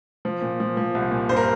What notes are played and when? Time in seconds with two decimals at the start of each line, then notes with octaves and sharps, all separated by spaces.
0.25 F3
0.42 A#2
0.60 F3
0.77 F3
0.95 C2
1.11 A#2
1.29 G2 C5
1.37 A#4